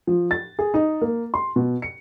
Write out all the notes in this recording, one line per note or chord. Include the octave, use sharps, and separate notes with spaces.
F3
A6
G#4
D#4
A#3
C6
B2
C#7